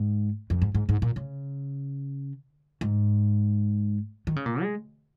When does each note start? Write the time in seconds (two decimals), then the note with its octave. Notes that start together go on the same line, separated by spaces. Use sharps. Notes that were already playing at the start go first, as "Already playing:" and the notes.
Already playing: G#2
0.50 F2
0.62 G#2
0.75 G#2
0.89 G#2
1.02 A#2
1.16 C#3
2.81 G#2
4.27 D#3
4.36 C#3
4.46 A#2
4.62 G#3